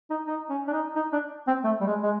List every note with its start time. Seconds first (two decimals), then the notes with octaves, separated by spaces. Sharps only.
0.10 D#4
0.27 D#4
0.50 C#4
0.67 D4
0.73 D#4
0.96 D#4
1.13 D4
1.47 C4
1.64 A3
1.81 G3
1.87 G#3
2.03 G#3